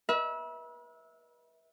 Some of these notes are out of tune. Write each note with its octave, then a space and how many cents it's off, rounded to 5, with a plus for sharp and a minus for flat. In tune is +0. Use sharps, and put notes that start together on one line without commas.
B4 -40 E5 -20